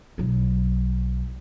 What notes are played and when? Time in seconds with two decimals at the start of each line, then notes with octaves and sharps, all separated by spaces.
0.18 B1 F#3